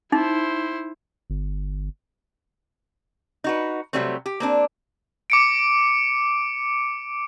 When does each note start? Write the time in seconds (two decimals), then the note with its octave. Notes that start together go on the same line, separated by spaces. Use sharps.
0.12 D#4 E4 C5
1.30 G1
3.44 D#4 F#4 B4
3.93 C3 F#3 G3 A3 C4
4.26 G4
4.40 A#3 C4 D4
5.30 D6 C#7 D7